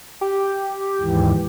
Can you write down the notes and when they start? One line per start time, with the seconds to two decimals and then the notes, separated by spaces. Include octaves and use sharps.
0.21 G4
1.01 D#2 G#2 E3